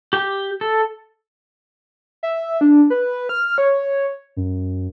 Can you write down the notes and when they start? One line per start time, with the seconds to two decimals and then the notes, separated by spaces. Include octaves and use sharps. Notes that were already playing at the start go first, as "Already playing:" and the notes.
0.13 G4 G5
0.61 A4
2.23 E5
2.61 D4
2.90 B4
3.29 F6
3.58 C#5
4.37 F#2